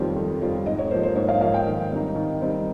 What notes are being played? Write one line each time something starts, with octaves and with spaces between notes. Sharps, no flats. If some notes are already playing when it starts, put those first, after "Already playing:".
Already playing: F2 D#3 G3 C4 F4 C#5
F2
D#3 G3 C4 F4
G#2 D#5
C#5
F3 A#3 C5
C5
G#2 C#5
F5
F3 A#3 F5
G5
D#3
G3 C4 D#4
D#3
G3 C4 D#4